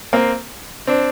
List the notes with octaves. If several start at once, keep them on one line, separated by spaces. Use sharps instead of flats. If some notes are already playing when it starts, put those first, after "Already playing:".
A#3 C4
C4 D4